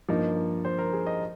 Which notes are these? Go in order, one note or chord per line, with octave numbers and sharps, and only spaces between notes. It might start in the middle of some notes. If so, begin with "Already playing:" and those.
G2 F3 A#3 D#4
C5
A#4
G#4
D#5